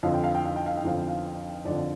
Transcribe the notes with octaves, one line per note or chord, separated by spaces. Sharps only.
F2 D3 F3 F5
G5
F5
G5
F5
G5
F5
G5
F2 D3 F3 F5
G5
F5
F2 D3 F3 D5